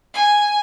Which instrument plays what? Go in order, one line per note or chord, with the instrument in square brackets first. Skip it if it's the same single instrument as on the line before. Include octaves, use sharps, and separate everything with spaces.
[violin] G#5